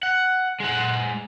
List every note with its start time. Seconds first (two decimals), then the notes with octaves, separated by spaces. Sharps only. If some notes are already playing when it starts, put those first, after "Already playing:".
0.03 F#5
0.60 G#3 F#5